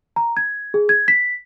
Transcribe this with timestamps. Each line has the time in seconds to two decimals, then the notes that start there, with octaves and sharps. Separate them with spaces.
0.16 A#5
0.37 G#6
0.74 G#4
0.89 G#6
1.08 B6